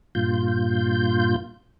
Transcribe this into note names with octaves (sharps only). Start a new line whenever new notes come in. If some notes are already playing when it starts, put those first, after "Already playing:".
G2 A#2 F4 G6